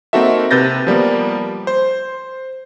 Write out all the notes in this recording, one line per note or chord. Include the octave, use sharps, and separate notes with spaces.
A#3 C4 D#4 F#4 A4 E5
C3 B4 G6 A6 A#6
F3 G3 A#3 B3
C5